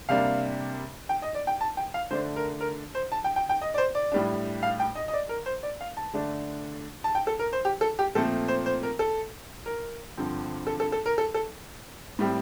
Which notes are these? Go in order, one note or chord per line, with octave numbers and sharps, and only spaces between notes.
C3 G3 A#3 D4 F5
G5
D#5
D5
G5
A5
G5
F5
D3 A3 D4 C5
A#4
A#4
C5
A5
G5
G5
G5
D#5
D5
C5
D5
A2 G3 D4
F5
G5
D#5
D#5
D5
A#4
C5
D5
F5
A5
D3 A3 D4
A5
G5
A4
A#4
C5
G4
A4
G4
A#2 F3 A3 C4 A4
C5
C5
A#4
A4
A#4
G2 D3 F3 C4
A4
A4
A4
A#4
A4
A4
A2 G3 C4